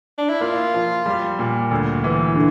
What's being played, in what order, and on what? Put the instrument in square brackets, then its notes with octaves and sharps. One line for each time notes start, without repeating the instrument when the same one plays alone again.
[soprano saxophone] D4
E4
[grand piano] A#3 [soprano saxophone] F4
[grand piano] F3
G3
A#2
D2
E3
D3